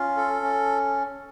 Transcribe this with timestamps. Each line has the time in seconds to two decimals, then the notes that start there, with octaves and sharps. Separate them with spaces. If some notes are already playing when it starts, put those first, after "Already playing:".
Already playing: C#4 F4
0.17 A4
0.42 C#4